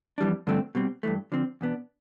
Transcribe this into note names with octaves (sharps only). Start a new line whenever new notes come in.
F2 E3 G3 D4
G2 D3 F3 A3 C4
B2 G3 C4
G2 E3 A3
D3 F3 C4
E2 B2 B3 D4